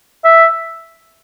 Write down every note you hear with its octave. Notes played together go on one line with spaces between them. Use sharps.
E5